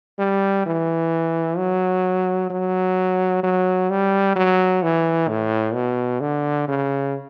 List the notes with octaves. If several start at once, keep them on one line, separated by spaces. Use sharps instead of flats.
G3
E3
F#3
F#3
F#3
G3
F#3
E3
A2
B2
D3
C#3